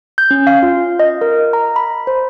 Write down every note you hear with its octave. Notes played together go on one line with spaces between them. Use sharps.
G6
C#4
F5
F4
D#5
A#4
A#5
B5
C5